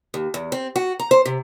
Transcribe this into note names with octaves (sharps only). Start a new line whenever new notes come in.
D#2
E2
C4
F#4
A#5
C5
C3